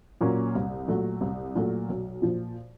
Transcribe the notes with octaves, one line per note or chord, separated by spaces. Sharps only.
A#2 F#3 A#3 C#4
C2
A#2 F#3 A3
C2
A#2 F#3 A3
B1
A#2 F3